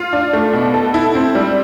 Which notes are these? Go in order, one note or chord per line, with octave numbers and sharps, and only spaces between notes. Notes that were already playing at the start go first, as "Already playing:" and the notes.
Already playing: F4
D4
A3
B2
A4
E4
C4
G3